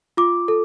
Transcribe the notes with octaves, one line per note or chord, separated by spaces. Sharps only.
F4 D6
A4